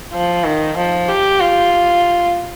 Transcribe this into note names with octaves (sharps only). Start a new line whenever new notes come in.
F3
D#3
F3
G4
F4